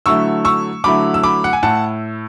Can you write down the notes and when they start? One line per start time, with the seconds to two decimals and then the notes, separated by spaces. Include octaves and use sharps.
0.06 D3 F#3 A3 E4 C#6 E6
0.45 C#6 E6
0.84 D3 F#3 A3 E4 B5 D6
1.14 E6
1.23 B5 D6
1.44 F#5
1.53 G#5
1.63 A2 F#5 A5